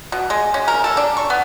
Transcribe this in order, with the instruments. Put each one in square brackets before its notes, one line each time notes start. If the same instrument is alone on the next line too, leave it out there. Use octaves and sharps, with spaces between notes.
[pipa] B2
G#3
C#4
A#4
A4
D4
C#6
B3